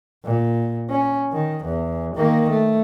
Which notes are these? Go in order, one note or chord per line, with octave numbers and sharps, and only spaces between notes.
A#2
C#4
D#3
E2
D#3 A#3
A3